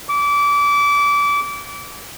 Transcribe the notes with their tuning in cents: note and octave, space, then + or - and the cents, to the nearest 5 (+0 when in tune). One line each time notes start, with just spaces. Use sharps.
D6 -25